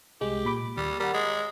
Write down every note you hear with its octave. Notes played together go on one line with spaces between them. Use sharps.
C2 G#3 G4
A#2 B5 D6
D#2 G3
G3 A#4 F#5
G#3